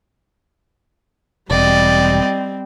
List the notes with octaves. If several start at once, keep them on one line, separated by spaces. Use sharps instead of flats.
E1 G3 C4 D5 D#5